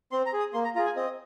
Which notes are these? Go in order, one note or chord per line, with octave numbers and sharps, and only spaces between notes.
C4 C6
A#5
G#4
D#6
A#3 C6
A#5
F4 G#4 A#5
G#5
C4 D#5